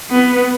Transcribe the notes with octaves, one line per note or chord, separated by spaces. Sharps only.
B3